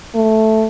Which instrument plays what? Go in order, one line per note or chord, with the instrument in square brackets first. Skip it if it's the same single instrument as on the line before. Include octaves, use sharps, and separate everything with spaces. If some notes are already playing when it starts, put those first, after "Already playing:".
[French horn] A3